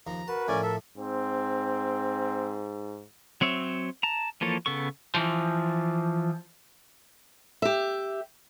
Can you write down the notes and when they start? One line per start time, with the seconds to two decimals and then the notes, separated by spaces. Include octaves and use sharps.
0.07 D#2 F3 A#5
0.28 F#4 A#4 B4 A5
0.48 A2 F3 A3 C#4 D5 G#5
0.63 A4 E5
0.98 G#2 C4
3.41 F#3 C4 C#5 E5
4.03 A5 A#5
4.41 E3 F3 A#3 A4 C#5
4.66 C#3 B3 A4 C#6
5.15 E3 F3
7.62 G4 E5